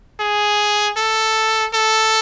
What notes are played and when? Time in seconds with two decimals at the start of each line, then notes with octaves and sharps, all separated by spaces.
0.20 G#4
0.97 A4
1.74 A4